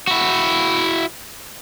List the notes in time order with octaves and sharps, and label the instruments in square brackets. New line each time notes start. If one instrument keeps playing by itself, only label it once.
[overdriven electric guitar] E4 F#4